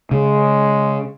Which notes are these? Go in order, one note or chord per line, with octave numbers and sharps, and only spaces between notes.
C#3 G#3